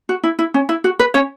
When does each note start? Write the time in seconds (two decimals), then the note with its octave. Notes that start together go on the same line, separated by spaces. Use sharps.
0.09 F#4
0.23 E4
0.39 E4
0.54 C#4
0.69 E4
0.84 F#4
0.99 B4
1.14 C#4 C#5